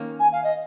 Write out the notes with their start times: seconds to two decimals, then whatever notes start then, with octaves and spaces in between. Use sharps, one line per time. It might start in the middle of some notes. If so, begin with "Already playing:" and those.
Already playing: D#3 A#3 C#4
0.19 G#5
0.32 F5
0.44 D#5